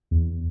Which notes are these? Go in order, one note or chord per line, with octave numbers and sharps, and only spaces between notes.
E2